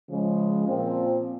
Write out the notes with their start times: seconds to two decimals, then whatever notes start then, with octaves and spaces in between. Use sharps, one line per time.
0.09 C#3 F3 G#3
0.66 A#2 F3 C4